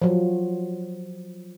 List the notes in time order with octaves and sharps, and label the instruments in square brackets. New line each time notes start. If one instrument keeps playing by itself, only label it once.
[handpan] F3 F#3